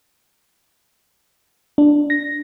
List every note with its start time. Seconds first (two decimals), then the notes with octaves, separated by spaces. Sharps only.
1.78 D4
2.10 A#6